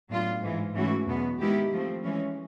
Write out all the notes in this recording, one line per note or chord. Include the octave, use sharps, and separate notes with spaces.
A2 F#3 B3 D4 F4
G#2 E3 G#3
G#2 E3 A3 C#4 F#4
E2 B2 F#3 B3
D#3 G#3 B3 E4 G4
F3 A3 C4
E3 G#3 C#4